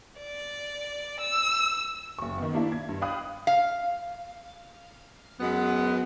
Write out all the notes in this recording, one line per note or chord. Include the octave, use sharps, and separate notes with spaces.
D5
E6
F#1 C#6
D#3 B3
A#3 D4 E4
G#6
G2
F5 G5 B5 D#6 F#6 G6
F5
F#2 G#3 B3